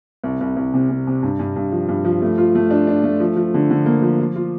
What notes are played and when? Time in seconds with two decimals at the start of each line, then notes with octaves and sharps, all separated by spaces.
0.24 C2
0.41 C2
0.56 C2
0.73 C3
0.89 C3
1.07 C3
1.23 G2
1.39 G2
1.56 G2
1.72 F3
1.88 G2
2.05 F3
2.22 A3
2.38 F4
2.55 A3
2.70 D4
2.87 D4
3.04 A3
3.20 F3
3.36 F3
3.54 D3
3.70 D3
3.86 A#3
4.02 F3
4.19 F4
4.36 F4